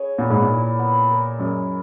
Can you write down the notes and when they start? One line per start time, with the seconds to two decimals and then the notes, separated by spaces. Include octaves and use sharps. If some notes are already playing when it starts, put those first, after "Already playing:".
Already playing: C#4 G#4 C#5
0.18 A#2 B3
0.30 G#2
0.42 A#2
0.49 E4 A#4
0.79 B3
1.09 E4 A#4
1.39 F#2 G#3